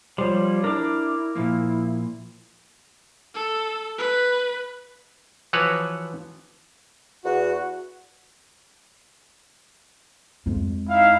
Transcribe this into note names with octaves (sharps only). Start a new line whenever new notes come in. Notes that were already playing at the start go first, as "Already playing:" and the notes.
F3 G3 C5 C#5
D4 E4 A#4 D6
A#2 F3 A#3 E4
A4
B4
E3 F3 F#4 B4 C#5
E2 F#4
F2 G#3
D#4 E4 F5